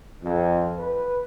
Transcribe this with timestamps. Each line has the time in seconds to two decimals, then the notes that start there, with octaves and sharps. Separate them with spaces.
0.23 F2
0.78 B4